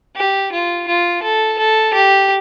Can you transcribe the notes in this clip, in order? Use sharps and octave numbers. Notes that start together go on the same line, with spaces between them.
G4
F4
F4
A4
A4
G4